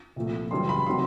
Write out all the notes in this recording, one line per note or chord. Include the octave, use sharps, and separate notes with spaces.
C2 A#2 F3 A3
F#2 C#3 E3 G3 C6
B5
C3 D#3 F#3 C6